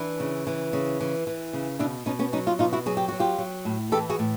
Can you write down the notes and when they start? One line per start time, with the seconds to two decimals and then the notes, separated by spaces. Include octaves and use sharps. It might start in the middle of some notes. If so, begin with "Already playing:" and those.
Already playing: E3 D4 E4
0.20 C#3
0.47 E3
0.73 C#3
1.00 E3
1.27 E3
1.53 C#3
1.79 B2 D4 E4
2.06 B2 C#4 D#4
2.19 B3 C#4
2.33 F#3 C#4 D#4
2.46 D#4 F4
2.59 B2 D#4 F4
2.73 E4 F#4
2.86 F#3 G#4
2.97 G4
3.08 F#3 F#4
3.20 F4 G4
3.38 F#3
3.65 A2
3.92 E3 G4 A4
4.10 F#4 G#4
4.19 A2